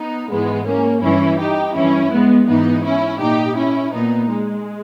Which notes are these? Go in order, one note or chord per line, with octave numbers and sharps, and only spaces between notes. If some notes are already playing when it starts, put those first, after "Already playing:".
Already playing: B3 D#4
G#2 E3 G#3 B3
A#3 C#4
G2 E3 C#4 E4
D#4 G4
G2 E3 C#4 E4
G#3 B3
G#2 E3 B3 D#4
C#4 E4
A#2 D#4 G4
C#4 E4
A#2 B3 D#4
G#3